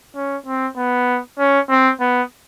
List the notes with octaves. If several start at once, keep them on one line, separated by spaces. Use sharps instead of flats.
C#4
C4
B3
C#4
C4
B3